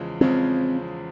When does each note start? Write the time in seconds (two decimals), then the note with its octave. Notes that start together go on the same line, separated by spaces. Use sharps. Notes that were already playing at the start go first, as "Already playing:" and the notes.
Already playing: E2 C#3 F3 G#3
0.21 E2 C#3 F3 G#3 C4